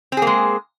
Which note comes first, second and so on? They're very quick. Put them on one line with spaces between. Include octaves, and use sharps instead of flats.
C4 G#4 A#3 G#3